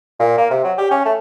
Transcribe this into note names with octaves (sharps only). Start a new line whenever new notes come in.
A#2
A#3
C3
F#3
G4
C#4
A3